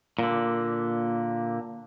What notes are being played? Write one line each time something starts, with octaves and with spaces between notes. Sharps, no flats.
A#2 D3